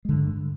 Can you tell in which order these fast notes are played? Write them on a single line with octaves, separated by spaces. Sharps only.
G#3 D3 G2